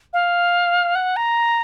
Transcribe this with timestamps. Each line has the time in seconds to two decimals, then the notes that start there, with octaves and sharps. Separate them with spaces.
0.13 F5
0.95 F#5
1.16 A#5